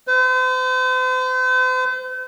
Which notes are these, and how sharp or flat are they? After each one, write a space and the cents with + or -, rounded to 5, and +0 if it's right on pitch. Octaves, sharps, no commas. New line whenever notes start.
C5 -40